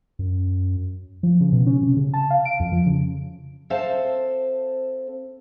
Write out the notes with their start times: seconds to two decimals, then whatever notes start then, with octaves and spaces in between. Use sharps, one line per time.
0.19 F#2
1.23 F3
1.41 C#3
1.52 B2
1.67 C#4
1.83 C3
1.97 C#3
2.14 A5
2.30 F5
2.45 D7
2.60 F2
2.72 F3
2.86 C#3
3.70 C4 A4 C5 E5 F5 A5